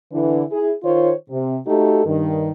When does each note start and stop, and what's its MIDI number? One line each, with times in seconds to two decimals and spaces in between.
0.12 0.42 50
0.12 0.42 52
0.51 0.73 64
0.51 0.73 68
0.84 1.13 51
0.84 1.13 65
0.84 1.13 72
0.84 1.13 73
1.30 1.57 48
1.67 2.05 57
1.67 2.05 63
1.67 2.05 66
1.67 2.05 67
1.67 2.05 69
2.06 2.51 43
2.06 2.51 51